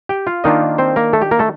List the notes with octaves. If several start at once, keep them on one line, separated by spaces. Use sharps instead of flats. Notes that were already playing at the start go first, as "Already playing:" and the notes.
G4 G5
F4 F5
D#3 A#3 D4 D#4 F4 D#5
C4 C5
A#3 A#4
A3 A4
G4
A#3 A#4
A3 A4